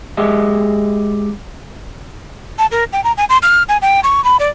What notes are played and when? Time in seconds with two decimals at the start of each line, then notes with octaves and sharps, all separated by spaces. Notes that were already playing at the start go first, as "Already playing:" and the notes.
0.17 G#3 G4 D#5 E5
2.58 A5
2.71 A#4
2.93 G5
3.04 A#5
3.17 G#5
3.29 C6
3.42 F6
3.69 G#5
3.82 G5
4.03 C#6
4.24 B5
4.39 D5